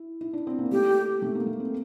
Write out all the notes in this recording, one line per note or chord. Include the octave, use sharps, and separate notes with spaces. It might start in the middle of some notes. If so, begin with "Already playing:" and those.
Already playing: E4
E4
D4
C4
A#3
A3 G4
A3
A#3
A3
C4